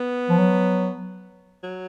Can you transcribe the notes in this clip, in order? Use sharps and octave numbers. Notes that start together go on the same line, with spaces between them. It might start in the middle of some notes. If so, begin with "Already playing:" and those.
Already playing: B3
F3
F#3
F#3